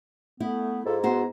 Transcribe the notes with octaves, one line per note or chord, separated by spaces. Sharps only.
A3 B3 E4
G#2 F4 A4
B3 E4 F#4 C5 A#5